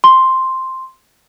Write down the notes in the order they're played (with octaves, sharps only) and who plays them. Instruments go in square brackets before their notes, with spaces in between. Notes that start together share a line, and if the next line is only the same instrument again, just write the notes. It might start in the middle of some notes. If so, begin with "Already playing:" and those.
[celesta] C6